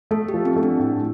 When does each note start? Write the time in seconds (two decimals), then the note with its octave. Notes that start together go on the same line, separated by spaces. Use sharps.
0.11 A3 A4
0.29 G4
0.34 F3
0.45 C4
0.56 A3
0.63 D4
0.79 A2